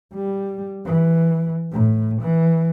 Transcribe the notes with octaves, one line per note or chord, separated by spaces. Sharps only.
G3
E3
A2
E3